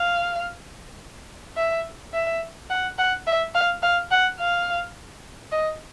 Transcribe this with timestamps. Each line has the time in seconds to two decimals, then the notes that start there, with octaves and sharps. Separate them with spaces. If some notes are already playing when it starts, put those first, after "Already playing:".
Already playing: F5
1.57 E5
2.14 E5
2.70 F#5
2.98 F#5
3.27 E5
3.55 F5
3.83 F5
4.11 F#5
4.39 F5
5.52 D#5